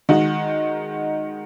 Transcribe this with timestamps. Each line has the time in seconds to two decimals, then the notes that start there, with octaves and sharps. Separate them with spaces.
0.09 D#3 G#3 D#4 F#4